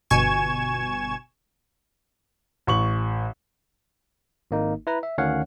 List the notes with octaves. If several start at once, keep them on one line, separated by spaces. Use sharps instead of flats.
G1 B2 G#5 C#6 G#6 E7
A1 C#6 F#7
G#1 A#3 D#4
E4 B4 A#5
E5
D2 D#3 C#4 C#5 F5 F#5